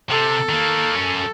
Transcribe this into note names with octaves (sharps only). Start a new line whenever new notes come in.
C3 A4
D#3 A#3
F#2 C#4